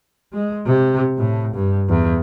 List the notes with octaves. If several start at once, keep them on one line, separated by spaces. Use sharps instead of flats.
G#3
C3
A2
G2
E2